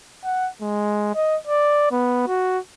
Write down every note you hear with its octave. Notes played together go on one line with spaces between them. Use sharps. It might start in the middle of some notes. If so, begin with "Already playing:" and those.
F#5
G#3
D#5
D5
B3
F#4